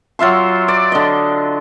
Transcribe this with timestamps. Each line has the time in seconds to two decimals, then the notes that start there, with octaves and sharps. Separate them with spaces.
0.19 F#3 F4 E5 C6
0.68 D5
0.92 D3 D#5